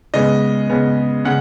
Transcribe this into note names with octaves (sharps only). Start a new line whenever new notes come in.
C#3 G#3 B3 D#5
C#3 G#3 B3
C#3 G#3 F#5